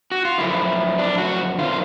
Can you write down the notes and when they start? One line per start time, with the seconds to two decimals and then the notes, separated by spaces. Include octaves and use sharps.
0.11 F#4
0.25 F4
0.38 F#2 D3 F3 E4
0.98 D4
1.18 F#4
1.58 F#2 D#3 F4